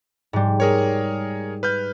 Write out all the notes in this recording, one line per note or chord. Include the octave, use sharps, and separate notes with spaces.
G#2 G3
G#4 A#4 C#5
B4 F6 G6